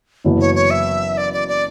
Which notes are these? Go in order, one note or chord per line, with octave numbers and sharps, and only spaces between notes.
F#1 F#2 E3 B3 E4
C#5
C#5
E5
D5
D5
D5